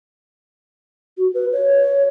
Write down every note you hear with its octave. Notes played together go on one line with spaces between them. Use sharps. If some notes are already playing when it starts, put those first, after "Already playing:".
F#4
B4
C#5